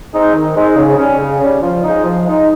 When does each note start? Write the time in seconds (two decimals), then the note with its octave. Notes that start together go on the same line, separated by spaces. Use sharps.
0.13 G#3 C4 D#4
0.34 D#3
0.55 G#3 C4 D#4
0.76 C#3
0.97 G3 C#4
1.18 C#3
1.40 G3 C#4
1.61 F3
1.82 G#3 D#4
2.04 F3
2.25 G#3 D#4